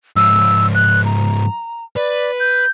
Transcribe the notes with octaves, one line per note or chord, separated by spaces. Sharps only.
G#2 F3 E6
F#6
A#5
B4 D5
G6